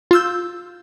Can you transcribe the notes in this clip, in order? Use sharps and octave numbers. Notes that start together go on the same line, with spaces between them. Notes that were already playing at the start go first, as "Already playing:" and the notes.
F4 E6 G6